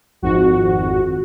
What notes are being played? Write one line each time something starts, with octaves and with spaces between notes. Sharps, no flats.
G#1 F2 F#4